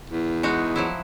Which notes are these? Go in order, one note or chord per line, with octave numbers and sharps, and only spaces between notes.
E2
G#3 D#4 F#4
F3 F#3 E4